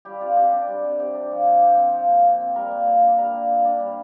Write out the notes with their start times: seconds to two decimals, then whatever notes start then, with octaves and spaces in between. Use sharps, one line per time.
0.05 G3 G4
0.21 C3 F4
0.36 C3 G4
0.53 D4
0.68 G3
0.84 C3
0.99 C3 G4
1.15 D4
1.31 F3
1.46 A#2
1.61 A#2 G4
1.77 C4
1.93 F3
2.08 A#2
2.25 A#2
2.40 C4
2.55 G3 A#4
2.71 A#2
2.86 A#2
3.03 D4
3.18 G3 A#4
3.34 A#2
3.50 A#2
3.65 D4
3.80 G3